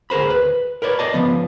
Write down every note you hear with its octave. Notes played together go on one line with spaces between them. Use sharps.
D2 G#4 A#4 C5 B5
B4
A#4 B4 C#5 D5
D5 D#5 A5
C#3 F3 B3